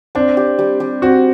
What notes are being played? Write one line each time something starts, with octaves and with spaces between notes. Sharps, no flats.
C4 D4
G4
G3
G3
C4 F#4